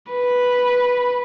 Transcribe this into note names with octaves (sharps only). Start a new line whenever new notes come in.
B4